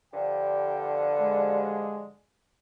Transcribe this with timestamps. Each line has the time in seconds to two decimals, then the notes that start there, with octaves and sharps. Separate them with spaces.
0.14 G2 D3 F3 G5
1.20 G#3